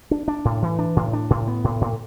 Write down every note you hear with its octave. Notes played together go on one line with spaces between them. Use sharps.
D4
D4
A2
E3
D4
A2
D4
A2
B3
A2
A2